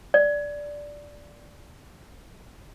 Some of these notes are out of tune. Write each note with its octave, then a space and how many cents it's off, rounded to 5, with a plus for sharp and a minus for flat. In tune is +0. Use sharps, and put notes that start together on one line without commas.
D5 -5